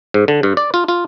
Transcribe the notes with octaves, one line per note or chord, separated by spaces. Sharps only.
G#2
D3
G2
D5
F4
F4